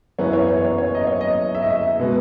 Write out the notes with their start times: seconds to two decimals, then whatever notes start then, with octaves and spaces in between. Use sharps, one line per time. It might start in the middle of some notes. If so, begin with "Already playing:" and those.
0.19 F#2 E3 B3 C#5
0.33 C#5
0.49 C#5
0.64 C#5
0.78 C#5
0.95 D#5
1.07 C#5
1.21 D#5
1.55 E5
1.62 D#5
1.70 E5
1.99 B2 G#3 B3